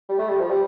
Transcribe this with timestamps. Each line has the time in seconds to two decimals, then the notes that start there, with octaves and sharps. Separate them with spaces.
0.09 G3
0.18 A3
0.29 G3
0.40 F3
0.50 G3